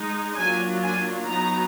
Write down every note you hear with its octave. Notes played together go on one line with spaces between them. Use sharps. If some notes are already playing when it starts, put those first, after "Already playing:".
Already playing: G#3 D#4
F#3 A#3 D4 F4 G#5
G#5
F#3 B3 D#4 A#5